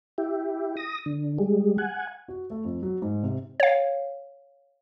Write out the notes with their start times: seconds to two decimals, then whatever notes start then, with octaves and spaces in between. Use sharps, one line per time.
0.18 E4 G4
0.77 D#6 A#6
1.06 D3
1.38 G3 G#3
1.78 F#5 G#5
2.28 F#4
2.50 A3
2.64 F2
2.83 F#3
3.02 G#2
3.23 C3
3.60 C#5 F5